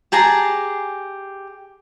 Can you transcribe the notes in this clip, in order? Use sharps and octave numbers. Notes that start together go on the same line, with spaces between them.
G4 G#4 A5 A#5